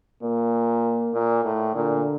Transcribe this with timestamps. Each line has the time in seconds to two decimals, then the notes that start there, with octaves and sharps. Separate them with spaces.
0.23 A#2 A#3
1.14 A#2
1.44 A2
1.75 A#2 D3